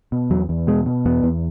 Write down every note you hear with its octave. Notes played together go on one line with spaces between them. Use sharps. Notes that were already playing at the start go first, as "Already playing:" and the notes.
B2
E2 F#3
E2
B2 G#3
B2
E2 B3
E2